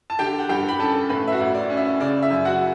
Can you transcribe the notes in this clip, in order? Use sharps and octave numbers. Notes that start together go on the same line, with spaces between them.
A5
D3 G4 G5
F#5
G2 G4 G5
B5
C#4 A4 A5
A2 B4 B5
E5
F#4 F#5
A1
D5
C#4
E5
C#3 D5
E5
F#2
F#4 F#5